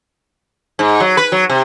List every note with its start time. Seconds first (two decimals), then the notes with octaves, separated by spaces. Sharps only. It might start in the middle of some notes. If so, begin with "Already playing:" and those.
0.79 G#2
1.00 F#3
1.17 B4
1.32 F#3
1.49 C3